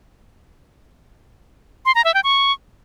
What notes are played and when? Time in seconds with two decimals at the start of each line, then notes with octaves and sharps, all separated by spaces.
1.85 C6
1.95 A#5
2.05 E5
2.14 G5
2.24 C#6